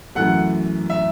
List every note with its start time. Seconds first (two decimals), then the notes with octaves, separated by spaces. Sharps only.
0.15 F#2 E3 A3 F#5
0.90 E5